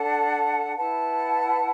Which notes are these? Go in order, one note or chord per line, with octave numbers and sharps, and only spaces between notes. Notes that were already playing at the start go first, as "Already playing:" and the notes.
Already playing: D4 A4 F#5 A5
E4 B4 F#5 A5